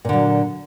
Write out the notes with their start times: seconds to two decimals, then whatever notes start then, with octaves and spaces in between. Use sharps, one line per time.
0.05 A#2
0.09 D3
0.13 F#3